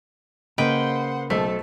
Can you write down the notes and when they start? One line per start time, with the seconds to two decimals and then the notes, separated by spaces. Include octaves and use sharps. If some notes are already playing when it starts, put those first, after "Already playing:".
0.58 C#3 A#3 B4 C5 D#5 F#5 G5
1.30 B1 A3 A4 C5 A5 B6